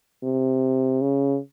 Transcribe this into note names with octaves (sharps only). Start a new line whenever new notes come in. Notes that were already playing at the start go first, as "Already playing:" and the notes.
C3
C#3